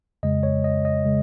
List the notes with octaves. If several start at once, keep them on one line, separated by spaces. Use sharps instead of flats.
F2 C#3 G#3 D#5
C#5
D#5
D#5
C#3 G#3